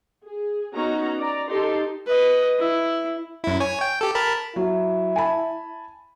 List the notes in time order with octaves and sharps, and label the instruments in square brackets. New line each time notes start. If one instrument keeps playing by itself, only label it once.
[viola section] G#4
B3 C#4 D#4 F#4 A#5
D5 A#5
D#4 G4 A4 C6
[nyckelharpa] B4 D#5
E4
[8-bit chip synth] F#2 E4
C#5 G#5
G5
G4 A4
A#4 A5 B5
[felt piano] F#3 [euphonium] E4
[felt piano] G#5 A5 B5